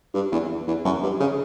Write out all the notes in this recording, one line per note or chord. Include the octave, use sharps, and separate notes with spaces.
G2
E2
E2
F#2
G2
C#3